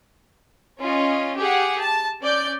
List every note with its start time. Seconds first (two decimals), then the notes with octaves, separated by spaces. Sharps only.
0.79 C#4 F4 D#5
1.37 G4 G#4 F#5
1.80 A5
2.22 C#4 D5 G6